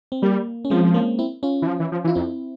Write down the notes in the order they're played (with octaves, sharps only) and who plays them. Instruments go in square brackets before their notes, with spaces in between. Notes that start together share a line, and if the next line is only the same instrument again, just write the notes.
[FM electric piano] C4
[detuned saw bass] G3 [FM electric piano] A#3
[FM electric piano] C#4
[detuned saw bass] F3 [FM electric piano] G#3 C4
[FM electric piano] A#3 C#4
C4 E4
C#4 F4
[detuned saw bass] E3
F3
E3
F3
E3
[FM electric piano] F4
[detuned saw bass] F2 [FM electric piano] C4 E4